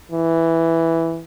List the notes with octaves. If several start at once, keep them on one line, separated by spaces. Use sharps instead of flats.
E3